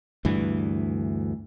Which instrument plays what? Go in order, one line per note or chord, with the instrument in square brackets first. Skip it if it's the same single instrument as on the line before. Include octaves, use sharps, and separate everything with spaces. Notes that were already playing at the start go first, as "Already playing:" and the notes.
[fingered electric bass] D2 G2 E3